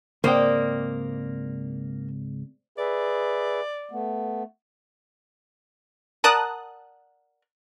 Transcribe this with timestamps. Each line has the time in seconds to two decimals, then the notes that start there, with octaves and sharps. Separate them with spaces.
0.24 C#2 G#2 A#3 C4 C5 D5 D#5 G5
2.78 G#4 B4 D5 E5
3.91 A3 B3
6.24 A#4 D5 F#5 A5 D#6 F#6